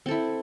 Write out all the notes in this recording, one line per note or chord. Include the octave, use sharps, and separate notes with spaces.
C4 E4 A4